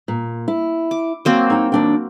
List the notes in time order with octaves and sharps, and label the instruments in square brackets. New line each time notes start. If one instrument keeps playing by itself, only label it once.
[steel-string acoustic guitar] A#2
E4
[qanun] D6
F#3 A#3 C4
[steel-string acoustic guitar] D#4 G5
D#2 D4 G5